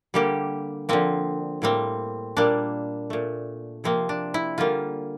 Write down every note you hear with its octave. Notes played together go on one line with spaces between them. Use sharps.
D3 G3 A#3 G4
D3 F3 A#3 C4
A2 G3 A#3 C4
A#2 G3 A#3 D4
A#2 A3
C3 F3 A#3 C4
D4
E4
D3 G3 A#3 F4